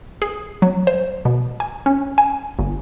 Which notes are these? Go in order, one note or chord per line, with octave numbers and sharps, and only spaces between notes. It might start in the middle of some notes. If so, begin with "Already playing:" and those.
G#4
F#3
C5
B2
G#5
C#4
G#5
G1